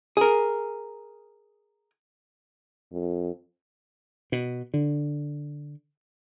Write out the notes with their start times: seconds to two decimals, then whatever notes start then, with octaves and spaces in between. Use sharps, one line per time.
0.17 G#4 A#4
2.93 F2
4.32 B2
4.74 D3